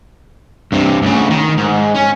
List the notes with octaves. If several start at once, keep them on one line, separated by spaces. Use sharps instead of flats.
G2 C3
D2 C#3
D#3
G#2
C#4